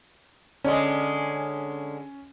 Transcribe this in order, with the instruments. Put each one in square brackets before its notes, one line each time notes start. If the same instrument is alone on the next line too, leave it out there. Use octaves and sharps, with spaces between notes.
[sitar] D3 G#3 [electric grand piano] C#4